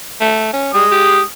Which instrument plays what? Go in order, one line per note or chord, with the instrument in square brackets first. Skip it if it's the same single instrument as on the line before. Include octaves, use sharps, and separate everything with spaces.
[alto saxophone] A3
C#4
[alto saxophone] G3 [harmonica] G#3 D#6
[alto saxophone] G4